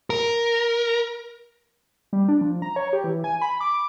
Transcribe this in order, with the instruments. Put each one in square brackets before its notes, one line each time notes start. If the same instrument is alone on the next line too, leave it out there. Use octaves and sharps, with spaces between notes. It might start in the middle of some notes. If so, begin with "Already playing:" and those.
[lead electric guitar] A#4
[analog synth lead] G3
D4
F3
A#5
C#5
G4
E3
G#5
B5
D6